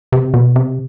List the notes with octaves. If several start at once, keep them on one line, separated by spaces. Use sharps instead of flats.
C3
B2
C3